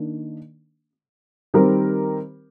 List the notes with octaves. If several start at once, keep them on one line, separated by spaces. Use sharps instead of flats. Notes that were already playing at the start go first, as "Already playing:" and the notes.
Already playing: D#3 A#3 D4
D#3 G3 C4 G4 A#4